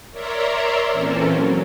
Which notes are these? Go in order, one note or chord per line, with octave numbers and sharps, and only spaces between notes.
A#4 C#5 D5 E5 A#5 C6
A#2 E3 A#3 C4 C#4 A4
F#3